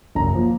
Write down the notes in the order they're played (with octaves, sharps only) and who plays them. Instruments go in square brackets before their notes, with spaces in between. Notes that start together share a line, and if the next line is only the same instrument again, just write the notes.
[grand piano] F#1 A#5
F3 A#3